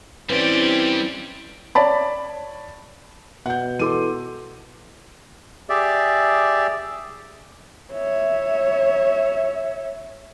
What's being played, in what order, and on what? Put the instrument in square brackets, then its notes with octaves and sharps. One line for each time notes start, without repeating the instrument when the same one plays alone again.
[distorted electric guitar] G2 G3 [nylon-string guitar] E3 [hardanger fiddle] C4 G4 [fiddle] C#4 D5
[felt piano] C#5 D5 A5 B5
[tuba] B2 [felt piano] F#5 G6
[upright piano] E3 A4 [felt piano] C6 D6 D#7
[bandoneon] G4 G#4 D5 E5
[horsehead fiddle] C#5 E5